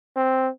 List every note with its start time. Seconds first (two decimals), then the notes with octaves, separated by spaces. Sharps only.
0.16 C4